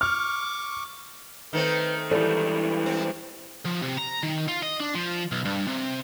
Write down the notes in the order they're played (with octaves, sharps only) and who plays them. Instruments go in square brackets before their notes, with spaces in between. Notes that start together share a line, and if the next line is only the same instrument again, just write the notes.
[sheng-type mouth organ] C#6 D6 [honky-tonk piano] F6
[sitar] D#3 A3 C4 [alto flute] B4
[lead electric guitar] G#2 G3 [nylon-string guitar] E3 A4 D5 [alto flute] E4
[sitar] C4
[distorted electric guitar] F3
C3
A#5
D#3
F4
D#5
D4
F3
B1
G2
C3